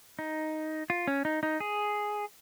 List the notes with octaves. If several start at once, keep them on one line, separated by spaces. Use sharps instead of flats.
D#4
F4
C#4
D#4
D#4
G#4